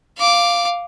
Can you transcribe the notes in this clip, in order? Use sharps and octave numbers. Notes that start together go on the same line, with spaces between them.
F5 D6